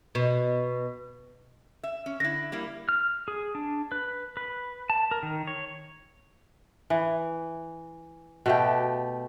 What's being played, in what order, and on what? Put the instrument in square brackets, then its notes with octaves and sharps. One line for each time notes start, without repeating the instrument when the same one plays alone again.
[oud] B2
[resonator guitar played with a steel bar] E5
C#4
[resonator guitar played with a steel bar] D3 E4 [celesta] A#6
[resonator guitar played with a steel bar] G3 A#3 E4
[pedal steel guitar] F6
G#4
D4
B4
B4
A5
A#4
D#3
C#5
[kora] E3
B2 A3 G4